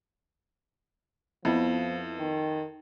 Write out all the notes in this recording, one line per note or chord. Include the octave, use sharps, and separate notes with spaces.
F2 F3 B3 E4
D#3